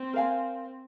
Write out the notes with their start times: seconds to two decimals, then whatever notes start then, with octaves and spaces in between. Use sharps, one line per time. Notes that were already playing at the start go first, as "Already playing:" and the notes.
Already playing: C4
0.13 A#4 F5 G#5